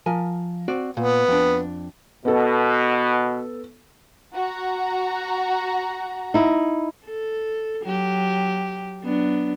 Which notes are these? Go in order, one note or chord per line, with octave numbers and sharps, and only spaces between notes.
F3 A#4 G#5
C4 F#4 D5
A#2 B3
F2 D4
B2 B3 A4
F#4 F#5 A#5
D#4 E4
A4
F#3 G4
F#3 B3 D4